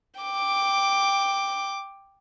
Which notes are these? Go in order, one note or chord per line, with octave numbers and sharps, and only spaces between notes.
G5 D6